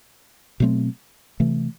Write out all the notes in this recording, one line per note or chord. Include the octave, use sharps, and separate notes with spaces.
B2 F#3 A3 C4
C3 E3 A3